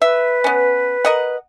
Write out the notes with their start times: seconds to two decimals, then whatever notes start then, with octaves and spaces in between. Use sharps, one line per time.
0.02 B4 E5
0.44 B3 C#4
1.05 A#4 D#5 F#5